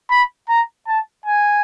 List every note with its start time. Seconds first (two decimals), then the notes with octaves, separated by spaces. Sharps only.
0.11 B5
0.49 A#5
0.87 A5
1.26 G#5